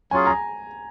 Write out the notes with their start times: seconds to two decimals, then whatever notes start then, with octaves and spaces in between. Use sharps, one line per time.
0.11 F#3 C#4 F4 G#4 G#5
0.27 A#5